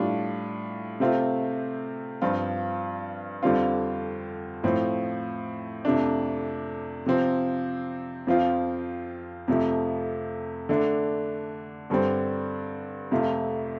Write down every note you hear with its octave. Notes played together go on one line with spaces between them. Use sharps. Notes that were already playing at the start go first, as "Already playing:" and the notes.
Already playing: A2 G3 D4 F4
C3 A3 C4 F4
G2 F3 C4 F4
F2 D3 G3 C4 F4
A2 F3 C4
F2 C3 A3 D4
C3 F3 C4
F2 F3 C4 F4
F2 C3 F3 A3
D3 A3 D4
G2 D3 G3 C4
F2 C3 A3 F4